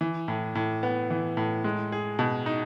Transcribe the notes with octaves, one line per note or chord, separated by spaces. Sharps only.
E3
A2
A2
B3
E3
A2
G#3
G#4
B2
D#4